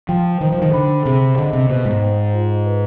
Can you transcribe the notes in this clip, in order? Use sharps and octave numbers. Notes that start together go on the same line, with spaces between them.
F3 G5
D#3 C5
F3
D#3
D3 B5
C3 G#4
D3 D#5
C3
B2 C5
G#2
G5
F4
B4